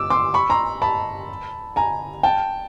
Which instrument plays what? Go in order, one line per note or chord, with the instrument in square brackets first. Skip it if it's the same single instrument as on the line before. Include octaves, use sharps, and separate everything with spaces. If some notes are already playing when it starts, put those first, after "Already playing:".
Already playing: [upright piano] D6 E6
C6 D6
B5 C#6
A#5 C6
A5 B5
G#5 A#5
G5 A5